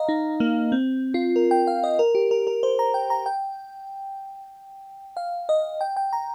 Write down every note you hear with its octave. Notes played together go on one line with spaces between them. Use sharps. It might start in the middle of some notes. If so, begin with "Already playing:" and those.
Already playing: D#5 F5 A#5
D#4
A#3
C4
F4
A#4
G5
F5
D#5
A#4
G4
A#4
A#4
C5
A#5
G5
A#5
G5
F5
D#5
G5
G5
A#5